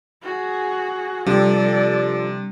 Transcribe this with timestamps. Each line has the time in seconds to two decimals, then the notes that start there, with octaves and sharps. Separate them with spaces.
0.23 F#4 G#4
1.26 C3 F3 G3 D4 G4 A4 D5